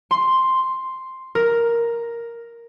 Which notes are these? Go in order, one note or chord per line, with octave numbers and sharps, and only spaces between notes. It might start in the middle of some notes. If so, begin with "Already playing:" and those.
C6
A#4